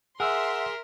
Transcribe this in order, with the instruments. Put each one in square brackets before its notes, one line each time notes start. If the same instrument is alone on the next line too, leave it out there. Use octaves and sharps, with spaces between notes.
[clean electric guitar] G#4 [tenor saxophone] A#4 [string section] E5 C6 [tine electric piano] F#5 E6